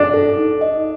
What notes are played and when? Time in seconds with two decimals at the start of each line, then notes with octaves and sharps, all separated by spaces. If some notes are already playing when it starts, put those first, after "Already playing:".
Already playing: D4
0.14 A4
0.37 D#4
0.61 D#5